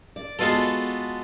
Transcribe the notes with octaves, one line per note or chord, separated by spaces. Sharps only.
D5
G#3 B3 F4 F#4 A4